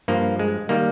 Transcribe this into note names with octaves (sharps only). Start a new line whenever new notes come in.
G2 F3 A#3
G#3
D#3 G3 A#3